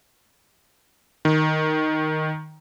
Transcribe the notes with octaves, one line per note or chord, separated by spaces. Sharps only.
D#3